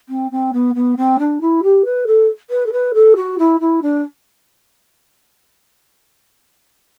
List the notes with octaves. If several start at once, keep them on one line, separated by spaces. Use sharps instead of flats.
C4
C4
B3
B3
C4
D4
E4
G4
B4
A4
B4
A4
B4
A4
F#4
E4
E4
D4